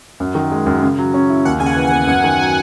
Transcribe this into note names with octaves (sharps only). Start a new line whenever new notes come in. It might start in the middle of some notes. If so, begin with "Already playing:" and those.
F#2
D#3
G#3
F#2
C#3
F#3
C#4
E4
D#2 F#5
C#3 G#5
F#5
E3
F#5
B3
F#2 F#5
D#3
F#5
F#3 G#5